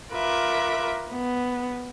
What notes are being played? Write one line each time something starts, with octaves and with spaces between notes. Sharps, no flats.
F4 A#4 B4 E5 D6
B3